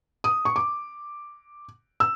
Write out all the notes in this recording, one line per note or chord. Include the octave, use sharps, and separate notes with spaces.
D#6
C#6
D6
E6